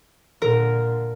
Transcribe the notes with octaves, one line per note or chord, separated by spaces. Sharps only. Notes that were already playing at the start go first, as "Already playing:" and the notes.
A#2 D3 A#4